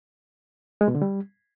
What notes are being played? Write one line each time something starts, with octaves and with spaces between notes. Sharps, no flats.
G#3
B2
D3
G3